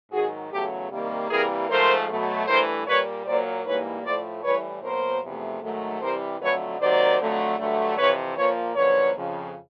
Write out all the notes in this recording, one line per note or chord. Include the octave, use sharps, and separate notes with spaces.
G#2 D#3 F#3 F#4 G#4
E2 C#3 F#3 A3 G4 A4
C3 D#3 G3 A#3
C3 E3 G3 A#3 G#4 A#4
G#2 F3 A3 A#4 C5
B2 F#3 A3
G2 E3 A3 A#4 C5
A#2 G3 A#3 B4 C#5
A#2 F#3 A#3 C5 D5
G#2 E3 G3 A#3 B4 C#5
A2 F3 A3 C5 D5
A2 E3 G3 B4 C#5
B2 F#3 A#3 A#4 C5
E2 C3 F3 A3
G#2 D#3 F#3 A3
C3 E3 G3 A#4 C5
F2 D3 F#3 A3 B4 C#5
C3 D#3 F#3 A#3 C5 D5
F2 D3 F#3 A3
G2 D3 F#3 A3
F2 C3 E3 B4 C#5
A#2 F3 A#3 B4 C#5
F#2 D3 F3 A#3 B4 C#5
F2 C#3 F3